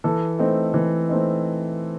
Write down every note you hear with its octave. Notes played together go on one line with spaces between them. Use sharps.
E3 A4
A3 C4 D#4
E3
A3 C4 D#4